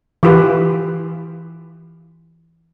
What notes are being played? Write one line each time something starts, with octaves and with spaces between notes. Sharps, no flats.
E3 F4 G4 B4